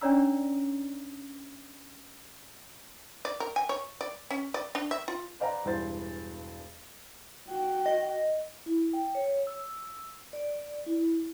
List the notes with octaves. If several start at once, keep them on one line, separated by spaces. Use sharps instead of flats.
C#4 D4 C#5 D5 A#5 E6
D5
A#4
G#5
C#5
D5
C#4
D5
D4
E5
F4
B4 C5 D5 F5 G5 A#5
E1 G2 E3 C5 A6
F#4 G5
D#5
E4
G5
C#5
E6
D5
E4